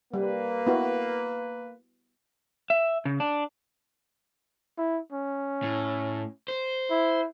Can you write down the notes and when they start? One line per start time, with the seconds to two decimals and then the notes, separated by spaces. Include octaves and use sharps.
0.14 G3 A#3 B4
0.67 B3 E4 F#4
2.70 E5
3.05 C#3
3.20 D4
4.78 E4
5.12 C#4
5.63 A2
6.48 C5
6.91 E4